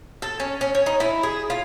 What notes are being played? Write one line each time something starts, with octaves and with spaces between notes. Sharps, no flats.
A4
C#4
C#4
C#5
D#4
E4
G#4
F4